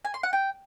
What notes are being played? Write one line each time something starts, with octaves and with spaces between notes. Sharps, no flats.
G#5
C6
F#5
G5